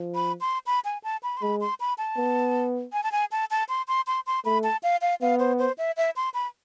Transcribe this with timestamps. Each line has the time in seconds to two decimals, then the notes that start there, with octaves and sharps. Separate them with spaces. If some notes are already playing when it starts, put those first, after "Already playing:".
Already playing: F3
0.15 B5
0.41 C6
0.66 B5
0.85 G#5
1.03 A5
1.23 B5
1.37 C6
1.42 G#3 B5
1.61 C6
1.80 B5
1.98 A5
2.17 B3
2.93 G#5
3.03 A5
3.12 G#5
3.31 A5
3.51 A5
3.69 C6
3.88 C6
4.07 C6
4.26 C6
4.45 A3 B5
4.63 A5
4.83 F5
5.01 F5
5.21 B3 F5
5.39 C5
5.59 C5
5.78 E5
5.97 E5
6.16 C6
6.34 B5